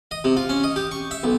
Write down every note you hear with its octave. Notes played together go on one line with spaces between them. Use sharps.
D#5
C3
F4
C#4
D#5
G4
C#6
E5
B1